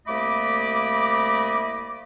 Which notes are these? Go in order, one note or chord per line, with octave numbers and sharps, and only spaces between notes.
C2 A3 A#3 D#5 B5 D6